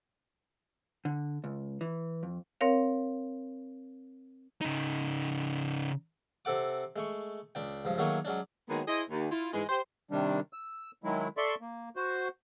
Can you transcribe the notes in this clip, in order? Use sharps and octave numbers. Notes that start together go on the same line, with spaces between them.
D3
C#2
E3
F2
C4 A#4 C#5 F5
C#3 D#4
C3 C4 A4 F#5 D6
G#3 A3 C#6
C#2 D4 G5
C#2 G2 F3
D#3 F#3 A3 A#3 G#4 C#5
F#3 G#3 C#4 D4
D#3 F#3 G#3 A#3 B3
E4 G#4 C5 D#5
D#2
E4 F4
G#2 E3 G#3
G4 C5
C3 D#3 G3 D4
E6
D#3 F#3 G#3 E4
A4 D5 E5 C6 C#6
A#3
F#4 C5